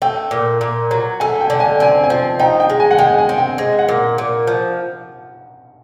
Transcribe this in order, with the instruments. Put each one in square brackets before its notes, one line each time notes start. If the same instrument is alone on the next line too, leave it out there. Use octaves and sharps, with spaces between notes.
[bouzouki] A3 [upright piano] G5
[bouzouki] A#2
A#2
F#3
[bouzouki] A3 [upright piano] G#5
[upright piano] G5
[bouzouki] D3
[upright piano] G#5
[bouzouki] C4 [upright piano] G#5
[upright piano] G#5
[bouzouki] F3
[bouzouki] D#4 [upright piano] G5
[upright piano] G5
[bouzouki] G#3
[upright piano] G#5
F#5
[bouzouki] G#3 [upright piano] G5
[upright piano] G#5
[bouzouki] C4
[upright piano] G5
[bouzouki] G#3
[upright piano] F#5
[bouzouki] A#2
A#2
F3